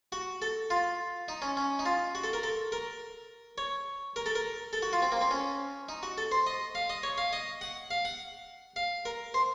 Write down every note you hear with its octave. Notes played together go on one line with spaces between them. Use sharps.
F#4
A4
F4
D#4
C#4
C#4
D#4
F4
F#4
A4
A#4
A4
A#4
C#5
A#4
A4
A#4
A4
F#4
F4
C4
A#3
C4
C#4
D#4
F#4
A4
C5
D#5
F5
D#5
C#5
F5
D#5
F#5
F5
F#5
F5
A#4
C5